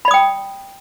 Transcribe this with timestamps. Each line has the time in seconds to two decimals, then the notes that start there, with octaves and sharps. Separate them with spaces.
0.05 B5
0.08 D5
0.11 D#6
0.14 G5